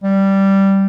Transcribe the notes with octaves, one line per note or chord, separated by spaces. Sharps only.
G3